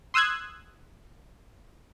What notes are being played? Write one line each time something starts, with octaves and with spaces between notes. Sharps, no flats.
C6 D#6 E6 F#6 G#6